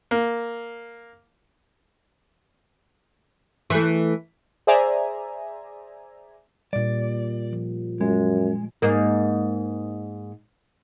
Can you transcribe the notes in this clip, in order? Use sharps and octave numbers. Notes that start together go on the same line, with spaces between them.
A#3
E3 A3
G#4 C5 D5 E5 G#5 A#5
A#2 G3 D5
F3
F#2 G#3
G#2 A#3